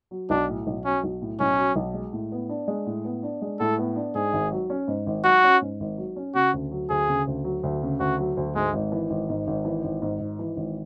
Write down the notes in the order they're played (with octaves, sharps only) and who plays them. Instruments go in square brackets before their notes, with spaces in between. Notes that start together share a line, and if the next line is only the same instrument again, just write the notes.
[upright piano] F#3
[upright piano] B1 [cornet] D4
[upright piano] A2
B1
[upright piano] F#3 [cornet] C#4
[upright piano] B1
A2
[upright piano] B1 [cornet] C#4
[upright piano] F#3
B1
G#3
A2
B3
D4
G#3
A2
B3
D4
G#3
[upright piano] A2 [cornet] A4
[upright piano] B3
D4
[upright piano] G#2 [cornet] G#4
[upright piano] G#1
F#3
C#4
G#2
G#1
[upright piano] F#3 [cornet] F#4
[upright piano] C#4
G#2
G#1
F#3
C#4
[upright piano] C#3 [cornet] F#4
[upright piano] D2
F#3
[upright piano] D2 [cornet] G#4
[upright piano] C#3
D2
F#3
D2
C#3
[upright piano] D2 [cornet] F#4
[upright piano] F#3
D2
[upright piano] G#2 [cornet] G#3
[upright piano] G#1
E3
G#1
G#2
G#1
E3
G#1
G#2
G#1
E3
G#1